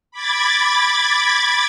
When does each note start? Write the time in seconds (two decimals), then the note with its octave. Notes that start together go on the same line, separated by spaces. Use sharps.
0.11 B5 D6 G#6 A6